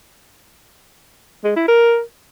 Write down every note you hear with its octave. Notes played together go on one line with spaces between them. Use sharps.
G#3
E4
A#4